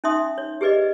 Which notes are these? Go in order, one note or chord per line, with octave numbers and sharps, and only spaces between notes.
C#4 D#4 E5 C6 D#6
C#5
G4 G#4 B4 D5 D#5